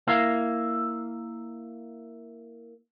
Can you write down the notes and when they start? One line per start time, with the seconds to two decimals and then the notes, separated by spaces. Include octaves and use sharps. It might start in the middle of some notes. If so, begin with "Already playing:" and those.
0.07 A#3 E4 F5